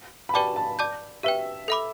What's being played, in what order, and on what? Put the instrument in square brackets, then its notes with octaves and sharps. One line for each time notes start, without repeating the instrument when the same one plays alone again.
[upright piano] B5
[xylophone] G4 B4 D5 G5 D6 [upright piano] A5
[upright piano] A5
[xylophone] D5 A5 D6 G6
[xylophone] G4 B4 G5 [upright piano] E5
[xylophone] A4 E5 B5 D6